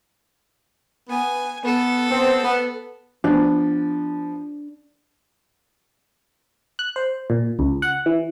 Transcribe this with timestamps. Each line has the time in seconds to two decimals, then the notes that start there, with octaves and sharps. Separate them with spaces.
1.10 B3 G#5
1.65 B3 A4
2.11 B3 C4
2.44 B3
3.24 F3 B3 D4
6.79 F#6
6.96 C5
7.30 A#2
7.59 C#2
7.82 F#5
8.06 E3